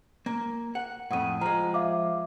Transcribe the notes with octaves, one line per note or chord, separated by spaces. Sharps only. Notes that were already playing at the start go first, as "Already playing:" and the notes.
A#3
F#5
F2 A2 F#5 D#6 D#7
F3 G#3 A#5
E5 F5 D6